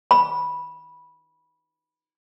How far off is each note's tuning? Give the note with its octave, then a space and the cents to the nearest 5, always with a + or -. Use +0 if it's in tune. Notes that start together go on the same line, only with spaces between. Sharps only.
B5 -10